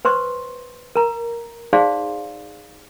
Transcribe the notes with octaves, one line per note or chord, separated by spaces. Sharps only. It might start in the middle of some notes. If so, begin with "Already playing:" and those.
B4 C5 C6 C#6
A#4 A#5
D#4 G#4 C5 D5 F5 C6